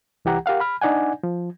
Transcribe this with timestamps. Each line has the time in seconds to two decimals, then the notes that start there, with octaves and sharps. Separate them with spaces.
0.25 C2 E3 G4 F#5 A#5
0.46 G4 A#4 F5 F#5
0.60 B5 F6
0.81 D4 D#4 D5 F#5 G#5
1.23 F3